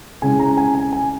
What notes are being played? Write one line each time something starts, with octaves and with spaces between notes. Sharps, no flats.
C#3 G#3 C#4 E4 G#5
A#5
G#5
G#5
G#5